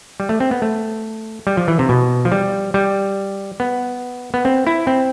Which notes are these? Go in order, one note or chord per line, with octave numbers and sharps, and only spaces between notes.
G3
A3
C4
B3
A3
G3
F3
E3
C3
B2
F3
G3
G3
B3
B3
C4
E4
C4